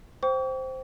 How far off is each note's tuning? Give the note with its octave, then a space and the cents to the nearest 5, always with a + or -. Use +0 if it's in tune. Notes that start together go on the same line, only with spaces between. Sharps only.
C5 +0 G5 -15 C#6 +45